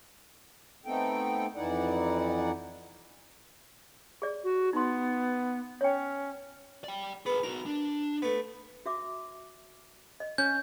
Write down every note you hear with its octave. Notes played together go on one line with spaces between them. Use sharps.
A3 B3 C4 D#4 A4 G5
F2 E3 D#4 E4 D5 F#5
G#4 D5
F#4
B3 D#4 C6
C#4 C#5 G5
D5 G5
B3 G#4 A#4
D#4 F#4 A#4
D4
A3 B3
F#4 E5 D6
D#5
C#4 C#5 G6